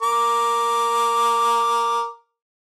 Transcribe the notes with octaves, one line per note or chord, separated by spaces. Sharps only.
A#4 D6